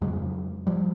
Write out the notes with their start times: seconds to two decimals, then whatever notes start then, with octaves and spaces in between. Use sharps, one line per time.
0.01 F2 C#3 F#3 G#3
0.67 F3 G3